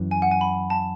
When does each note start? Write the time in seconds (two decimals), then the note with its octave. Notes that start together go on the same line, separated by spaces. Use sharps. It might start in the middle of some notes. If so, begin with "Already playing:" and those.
Already playing: F#2 E3
0.11 G#5
0.22 F#5
0.31 G#5
0.41 B5
0.70 A5